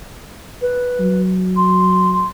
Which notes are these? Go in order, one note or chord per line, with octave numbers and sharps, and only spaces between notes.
B4
F#3
C6